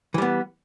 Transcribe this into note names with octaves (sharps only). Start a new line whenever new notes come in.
E3 G3 B3